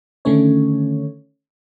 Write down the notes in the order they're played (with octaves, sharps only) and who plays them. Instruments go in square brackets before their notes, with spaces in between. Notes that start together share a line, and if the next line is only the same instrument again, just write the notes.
[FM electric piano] D3 D#3 A3 C#4 C#5